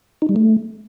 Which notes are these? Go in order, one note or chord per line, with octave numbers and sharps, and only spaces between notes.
D#4
G3
A3